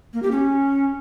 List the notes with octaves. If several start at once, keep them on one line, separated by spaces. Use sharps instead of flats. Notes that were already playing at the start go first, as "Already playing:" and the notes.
A#3
G4
C#4